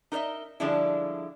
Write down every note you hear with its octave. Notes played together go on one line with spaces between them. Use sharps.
D#4 A#4 C#5 D#5 E5
D3 F3 G3 G#3 D4 E4